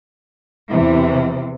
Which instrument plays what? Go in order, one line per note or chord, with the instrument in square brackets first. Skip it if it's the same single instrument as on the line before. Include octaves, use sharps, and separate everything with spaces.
[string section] E2 C3 E3